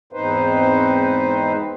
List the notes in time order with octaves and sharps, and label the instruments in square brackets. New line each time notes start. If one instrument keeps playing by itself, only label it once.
[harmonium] E2 G#2 C4 D#4 B4 C5